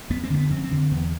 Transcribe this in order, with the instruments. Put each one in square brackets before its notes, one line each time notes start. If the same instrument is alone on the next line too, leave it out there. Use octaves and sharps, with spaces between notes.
[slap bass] F2 B3
C4
D3 A3
B3
F2 C4
C4
D3
E2 B3